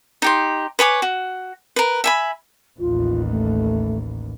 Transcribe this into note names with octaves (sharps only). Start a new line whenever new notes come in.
D#4 G4 C6
B4 C#5 G#5 D6
F#4
A#4 B4
E5 G#5 B5
A1 D#2 F4
A3